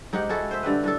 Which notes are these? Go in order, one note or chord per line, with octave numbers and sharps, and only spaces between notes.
G#2 D#4 G4 F#5
G#3 E4 F#4 A4
C5 E5
G2 D3 G4 B4
A2 D4 A4